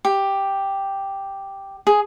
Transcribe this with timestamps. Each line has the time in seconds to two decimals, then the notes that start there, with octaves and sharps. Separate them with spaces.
0.05 G4
1.87 G#4